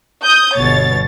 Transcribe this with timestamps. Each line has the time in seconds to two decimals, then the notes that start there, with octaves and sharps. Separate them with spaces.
0.24 D#6 G6
0.56 G1 B2 C#5 A6